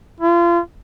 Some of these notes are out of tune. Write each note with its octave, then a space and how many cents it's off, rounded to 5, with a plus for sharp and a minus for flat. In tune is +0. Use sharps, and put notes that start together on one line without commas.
F4 -30